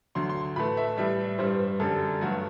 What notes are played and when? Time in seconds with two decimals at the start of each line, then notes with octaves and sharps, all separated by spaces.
0.15 D2 D3 F#3 C6
0.29 C6
0.56 A2 E3 A3 B5
0.77 E5
0.97 A2 E3 G3 E5
1.38 G2 E3 G3 C5
1.80 F#2 D3 G3 A4
2.21 G2 F#3 A3 F#4